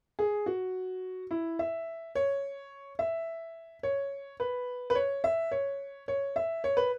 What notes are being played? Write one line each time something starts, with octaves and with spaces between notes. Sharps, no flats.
G#4
F#4
E4
E5
C#5
E5
C#5
B4
B4
C#5
E5
C#5
C#5
E5
C#5
B4